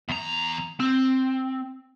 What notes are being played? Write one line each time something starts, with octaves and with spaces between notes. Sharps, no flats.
E2 A#5
C4